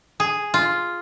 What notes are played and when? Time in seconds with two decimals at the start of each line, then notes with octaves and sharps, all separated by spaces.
0.20 G#4
0.54 F4